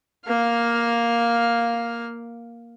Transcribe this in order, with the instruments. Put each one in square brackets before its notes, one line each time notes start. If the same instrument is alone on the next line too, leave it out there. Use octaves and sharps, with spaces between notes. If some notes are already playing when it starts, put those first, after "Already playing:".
[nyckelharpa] A#3 F5